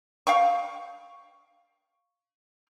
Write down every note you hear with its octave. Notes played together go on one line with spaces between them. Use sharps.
F5 G5 C#6